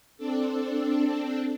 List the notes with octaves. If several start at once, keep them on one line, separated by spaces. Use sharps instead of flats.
C4 D4 A4